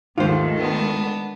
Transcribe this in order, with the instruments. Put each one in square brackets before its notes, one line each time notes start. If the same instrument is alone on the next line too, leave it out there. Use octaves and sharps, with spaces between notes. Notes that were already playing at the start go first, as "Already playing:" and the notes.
[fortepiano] D#2 G#2 [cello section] D#3 G#3 A3 [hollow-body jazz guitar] F4 C5
[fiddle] B3 D4